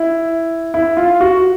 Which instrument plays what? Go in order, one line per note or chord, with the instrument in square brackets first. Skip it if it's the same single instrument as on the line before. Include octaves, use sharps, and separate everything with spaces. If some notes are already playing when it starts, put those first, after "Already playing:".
Already playing: [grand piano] E4
E4
F4
F#4